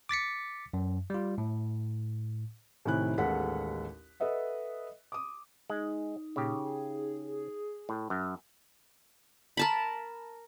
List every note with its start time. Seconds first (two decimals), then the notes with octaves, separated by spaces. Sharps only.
0.09 D6 A6 B6 C#7
0.73 F#2
1.10 G3 F4
1.38 A2
2.85 A2 C3 D#3 E4 G#5 F#6
3.18 A1 D#2 G#3 A4 F#5 B6
4.20 A4 B4 D#5 E5 F#5
5.12 D6 D#6
5.70 G#3 D#4
6.36 A#2 C#3 G4
6.65 G#4
7.89 A2
8.10 F#2
9.57 A#4 A5 B5